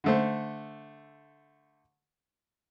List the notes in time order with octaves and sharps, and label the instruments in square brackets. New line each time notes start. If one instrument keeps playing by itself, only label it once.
[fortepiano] D3 A3 C5